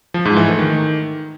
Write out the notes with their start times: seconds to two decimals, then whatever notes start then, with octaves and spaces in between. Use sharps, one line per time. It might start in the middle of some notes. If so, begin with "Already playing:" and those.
0.14 F3
0.25 G#2
0.36 E3
0.48 A3
0.59 D#3